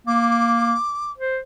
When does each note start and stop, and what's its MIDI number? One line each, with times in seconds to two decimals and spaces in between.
0.07 0.75 58
0.07 1.12 86
1.18 1.40 72